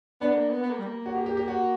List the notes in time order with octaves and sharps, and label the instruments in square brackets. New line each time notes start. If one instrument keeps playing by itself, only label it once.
[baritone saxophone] B3 [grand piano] D4
[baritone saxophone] B3
A#3
B3
B3
A#3
G3
A#3
[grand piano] F#4
G4
G4
G4
F#4